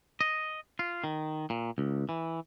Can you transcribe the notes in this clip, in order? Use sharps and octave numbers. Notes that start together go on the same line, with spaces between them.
D#5
F4
D#3
A#2
C#2
E3